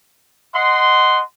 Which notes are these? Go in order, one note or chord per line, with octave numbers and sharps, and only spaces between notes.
D#5 F#5 C6